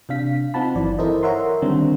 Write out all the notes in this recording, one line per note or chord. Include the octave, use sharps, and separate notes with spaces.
C3 D4 F5 B6
C4 D#4 F4 F#5 A5 B5
G1 E3 F#3 D5
E4 A4 A#4 C5 D#5
A#4 C#5 E5 F#5 A#5 C6
D3 D#3 G3 C4 D4